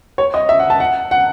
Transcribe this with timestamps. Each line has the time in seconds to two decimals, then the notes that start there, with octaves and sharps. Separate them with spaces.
0.18 C#5
0.34 D#5
0.49 E5
0.59 F#5
0.70 A5
0.80 F#5
1.11 F#5